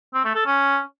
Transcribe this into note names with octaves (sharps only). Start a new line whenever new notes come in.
C4
A3
A4
C#4